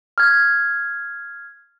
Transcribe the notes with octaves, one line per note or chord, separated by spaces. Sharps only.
F6 G#6